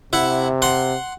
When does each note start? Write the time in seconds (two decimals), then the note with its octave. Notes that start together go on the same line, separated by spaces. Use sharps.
0.13 C3 E4 F#5
0.62 F#5 C6